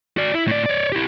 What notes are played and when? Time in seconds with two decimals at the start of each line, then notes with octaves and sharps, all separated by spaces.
0.17 F#4 D5
0.34 E4
0.47 A2 D5
0.66 C#5 D5
0.92 E4 G4